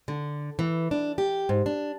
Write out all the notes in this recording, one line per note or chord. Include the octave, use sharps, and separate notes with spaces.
D3
E3
D4
G4
G#2
D4